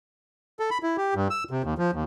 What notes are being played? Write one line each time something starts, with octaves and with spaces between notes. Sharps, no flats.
A4
B5
E4
G4
G2
E6
C3
D#2
F3
D#2